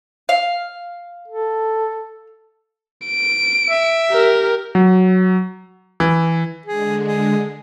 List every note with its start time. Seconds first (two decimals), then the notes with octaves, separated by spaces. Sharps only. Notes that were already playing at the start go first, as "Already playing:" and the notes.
0.29 F5
1.28 A4
3.07 D7
3.70 E5
4.10 G4 A#4
4.75 F#3
6.00 E3
6.66 D3 G#3 G#4
7.06 G#4